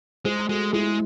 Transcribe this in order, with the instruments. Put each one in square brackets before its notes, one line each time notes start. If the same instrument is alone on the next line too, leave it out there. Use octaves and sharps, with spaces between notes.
[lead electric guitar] G#3 [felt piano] G#4 C5
[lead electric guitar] G#3 [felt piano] F#4 A4
[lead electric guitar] G#3 [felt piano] E4 G#4